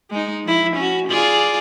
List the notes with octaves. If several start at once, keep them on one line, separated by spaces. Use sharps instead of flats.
G#3 D#4
F3 E4
C#4 F#4
F4 G#4 D5